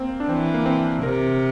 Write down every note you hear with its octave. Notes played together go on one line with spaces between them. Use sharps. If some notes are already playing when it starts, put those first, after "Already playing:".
Already playing: A#3 C4
D4
E3 C4
A#3
C4
C3 A#4